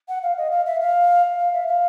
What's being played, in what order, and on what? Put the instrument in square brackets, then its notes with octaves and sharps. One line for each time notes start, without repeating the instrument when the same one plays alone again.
[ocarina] F#5
F5
D#5
F5
E5
F5
F5
E5
F5